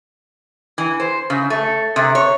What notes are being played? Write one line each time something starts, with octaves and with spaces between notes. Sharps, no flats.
E3
C5
C#3
A3
C3
C#5